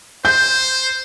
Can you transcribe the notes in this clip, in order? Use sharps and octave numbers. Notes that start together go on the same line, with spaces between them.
C5 G6